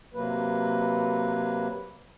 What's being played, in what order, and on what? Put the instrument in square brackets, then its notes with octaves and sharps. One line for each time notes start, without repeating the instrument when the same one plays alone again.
[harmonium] C3 F#3 A#3 B4